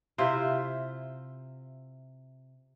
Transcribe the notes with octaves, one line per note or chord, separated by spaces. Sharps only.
C3 E4 F4 C5